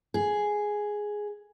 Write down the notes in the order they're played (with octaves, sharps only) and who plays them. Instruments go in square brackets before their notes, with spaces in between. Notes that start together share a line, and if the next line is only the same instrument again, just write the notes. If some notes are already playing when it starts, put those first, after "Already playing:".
[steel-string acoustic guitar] G#4